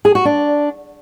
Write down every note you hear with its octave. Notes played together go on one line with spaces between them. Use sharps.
G#4
F#4
D4